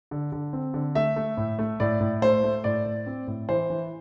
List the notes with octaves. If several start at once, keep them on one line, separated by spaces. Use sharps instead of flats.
D3
D3
C4
D3
A3 E5
A3
A2
A3
A2 D5
A2
A3 C5
A3
A2 D5
A2
C4
A2
E3 C5
E3